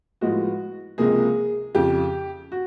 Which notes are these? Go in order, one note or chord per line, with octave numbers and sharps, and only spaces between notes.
A2 F3 G#3 B3 F#4
C#2 C3 F3 A#3 G#4
F2 C#3 F3 G4
F#4